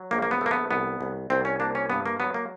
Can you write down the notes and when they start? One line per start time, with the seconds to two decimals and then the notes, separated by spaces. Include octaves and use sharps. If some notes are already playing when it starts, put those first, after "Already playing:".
Already playing: F#3
0.11 A#1 A#3
0.22 A#3
0.31 B3
0.41 A3 A#3
0.51 B3
0.71 C2 B3
1.01 C2
1.30 C2 C4
1.45 C#4
1.60 A#3 D4
1.75 C#4
1.90 G2 B3
2.06 A#3
2.20 F#3 B3
2.34 A#3